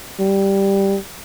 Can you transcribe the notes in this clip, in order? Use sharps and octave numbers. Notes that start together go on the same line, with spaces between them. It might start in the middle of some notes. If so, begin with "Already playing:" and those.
G3